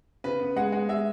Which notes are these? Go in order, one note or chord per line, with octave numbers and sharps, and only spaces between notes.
C#3 B4
B3
G#3 F#5
G#3 F#5
G#3 E5